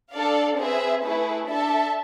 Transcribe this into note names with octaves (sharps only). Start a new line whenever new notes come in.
D4 A4 D5 F5
C4 G#4 B4 E5
A3 E4 G#4 B4
D4 A4 E5 A5